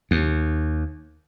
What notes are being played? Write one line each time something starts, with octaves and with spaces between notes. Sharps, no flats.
D#2